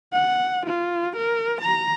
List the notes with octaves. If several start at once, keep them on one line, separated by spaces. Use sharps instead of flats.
F#5
F4
A#4
A#5